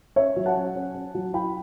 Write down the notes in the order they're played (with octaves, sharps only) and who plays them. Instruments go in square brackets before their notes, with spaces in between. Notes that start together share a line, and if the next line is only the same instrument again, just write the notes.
[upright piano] C#4 C#5 E5
F#3
F#5 A5
C#4
C#4
C#4
F#3
E4 G5 B5